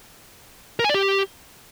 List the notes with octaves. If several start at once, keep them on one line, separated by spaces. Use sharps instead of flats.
A#4
G#5
D5
G4